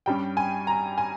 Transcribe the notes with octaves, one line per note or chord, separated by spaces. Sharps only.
G2 G3 C#4 G5
G#5
A#5
G#5